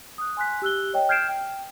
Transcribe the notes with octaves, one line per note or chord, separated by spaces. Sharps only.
D#6 F#6
G#5 C6 F#6 B6
G4 E6 F#6 G7
C#5 D#5 G5
F6 G6 G#6 C7 D7 E7
G5